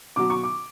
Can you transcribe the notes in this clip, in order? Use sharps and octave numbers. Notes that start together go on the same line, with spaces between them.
B2 F#3 D6
C#6
D6